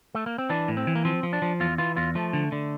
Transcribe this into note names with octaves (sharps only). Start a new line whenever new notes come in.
A3
A#3
C4
E3 D4
A2
C4
E3
A#3
F3 C4
F3
D4
F3
E2 F4
E3 F4
E2 F4
F3 A3
D3
D3